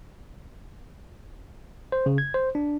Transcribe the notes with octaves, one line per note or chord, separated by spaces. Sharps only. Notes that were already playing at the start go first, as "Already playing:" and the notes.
C5
C#3
G#6
C5
D4